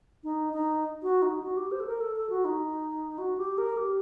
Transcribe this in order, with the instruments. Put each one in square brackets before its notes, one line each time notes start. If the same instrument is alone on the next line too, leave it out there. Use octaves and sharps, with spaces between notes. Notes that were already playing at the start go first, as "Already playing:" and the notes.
[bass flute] D#4
D#4
F#4
D#4
F#4
G4
C5
A4
A#4
A4
A4
F#4
D#4
F#4
G4
A#4
G4